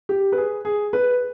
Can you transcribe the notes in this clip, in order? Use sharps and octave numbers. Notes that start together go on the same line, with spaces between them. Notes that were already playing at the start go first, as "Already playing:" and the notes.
G4
B4
G#4
G#4
B4